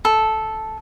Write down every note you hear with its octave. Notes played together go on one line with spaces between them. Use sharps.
A4